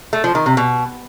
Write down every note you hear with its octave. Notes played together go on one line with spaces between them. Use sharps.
A3
F3
D#3
C3
B2